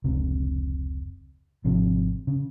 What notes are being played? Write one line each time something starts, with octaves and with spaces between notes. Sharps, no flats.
F1 C#2 C3
G#1 C3 F3
C#3